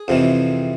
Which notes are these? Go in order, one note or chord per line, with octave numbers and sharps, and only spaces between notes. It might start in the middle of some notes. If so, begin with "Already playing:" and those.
Already playing: G#4
F2 C3 E3